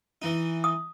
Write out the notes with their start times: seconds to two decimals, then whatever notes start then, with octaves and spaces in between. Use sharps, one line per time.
0.22 E3 D#4
0.64 D#6